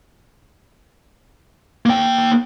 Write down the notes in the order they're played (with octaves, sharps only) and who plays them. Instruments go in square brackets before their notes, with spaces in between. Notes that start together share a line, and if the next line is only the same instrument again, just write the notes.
[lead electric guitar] A#3 G5